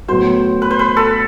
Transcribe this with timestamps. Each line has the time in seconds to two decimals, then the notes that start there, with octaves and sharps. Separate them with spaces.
0.08 A2 F#3 B3 F#4 C5
0.62 B4
0.71 C5
0.79 B4
0.97 A4